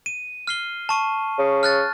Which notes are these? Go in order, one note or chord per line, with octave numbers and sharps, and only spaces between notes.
D#7
F6 C7 G7
A5 C#6 D#7
C#3
F6 F#6 A6